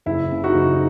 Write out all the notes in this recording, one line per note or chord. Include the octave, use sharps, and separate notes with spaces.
F#1 E4
C#3
D#4 F#4
F#1
D#4